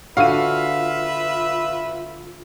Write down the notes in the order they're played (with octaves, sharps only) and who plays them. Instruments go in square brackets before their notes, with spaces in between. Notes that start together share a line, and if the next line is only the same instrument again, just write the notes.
[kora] D3 F#4 [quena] F4 [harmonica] B4 E5 [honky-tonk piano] F5 D#7